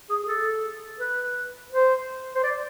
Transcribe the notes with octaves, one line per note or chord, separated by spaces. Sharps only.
G#4
G#4
A4
B4
C5
C5
D5